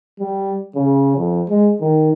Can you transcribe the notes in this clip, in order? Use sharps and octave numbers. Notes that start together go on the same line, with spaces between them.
G3
C#3
F2
G#3
D#3